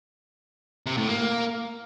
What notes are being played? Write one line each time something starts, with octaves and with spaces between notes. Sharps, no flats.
C3
A2
A#3